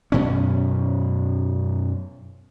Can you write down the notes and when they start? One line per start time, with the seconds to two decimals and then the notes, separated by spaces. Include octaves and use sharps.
0.12 F#2 B2 C#4